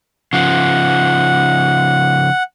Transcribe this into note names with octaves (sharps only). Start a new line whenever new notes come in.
C#3 F3 F#5